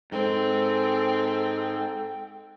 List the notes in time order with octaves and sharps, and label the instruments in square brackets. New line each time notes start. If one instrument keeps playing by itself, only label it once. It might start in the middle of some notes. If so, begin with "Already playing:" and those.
[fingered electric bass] G#2 [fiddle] C4 [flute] A4 [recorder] G5